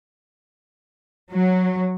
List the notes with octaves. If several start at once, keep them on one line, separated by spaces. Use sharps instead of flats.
F#3